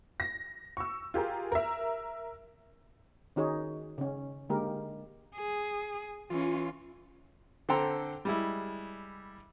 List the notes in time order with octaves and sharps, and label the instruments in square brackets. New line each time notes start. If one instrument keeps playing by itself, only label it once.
[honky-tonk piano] A#6
C#6 E6
F4 G4 G#4 A#4
A#4 E5
[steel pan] D#3 C#4 D#4 F#4 G#4 C#5
C#3 C#4
D3 G#3 A#3 G4 A#4
[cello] G#4
[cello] E3 C#4 [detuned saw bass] F4
[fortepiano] D3 C4 A4 G5 A#5 C6
G3 G#3 E4